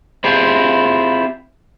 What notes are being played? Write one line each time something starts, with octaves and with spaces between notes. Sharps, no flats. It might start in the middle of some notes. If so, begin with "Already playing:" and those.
C4 E4 F4 G4 G#4